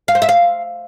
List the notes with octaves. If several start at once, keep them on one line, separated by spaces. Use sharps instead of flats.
F5
C5
E5
F5